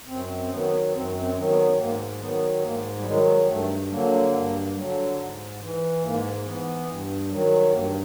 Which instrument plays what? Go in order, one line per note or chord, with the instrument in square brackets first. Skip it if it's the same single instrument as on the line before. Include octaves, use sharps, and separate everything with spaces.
[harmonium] F#2 C4
C4
D#3 F#3 B3
F#2 C4
C4
D#3 F#3
B3
G#2 A#3
D#3 F#3 B3
G#2 A#3
G3
D#3 F#3 G#3
G2 A3
D3 F#3 A#3
G2
D3 F#3
G#2
E3
G#2 A#3
E3 B3
G2
D#3 F#3
G2 A#3